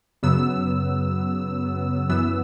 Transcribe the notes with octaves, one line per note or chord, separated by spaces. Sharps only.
F#2 C#3 F#3 B3 E6
F#2 E3 B3 E6